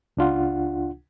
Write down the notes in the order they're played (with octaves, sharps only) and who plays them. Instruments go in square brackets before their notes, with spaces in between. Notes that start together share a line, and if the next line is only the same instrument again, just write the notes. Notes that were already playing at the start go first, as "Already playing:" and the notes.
[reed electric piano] C#2 D4 F4 F#5